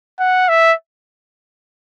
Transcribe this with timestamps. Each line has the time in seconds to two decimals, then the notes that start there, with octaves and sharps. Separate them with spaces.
0.19 F#5
0.49 E5